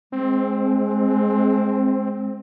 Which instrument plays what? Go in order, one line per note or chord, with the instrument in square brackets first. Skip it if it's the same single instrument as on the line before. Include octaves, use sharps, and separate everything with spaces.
[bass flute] G#3 [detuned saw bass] C4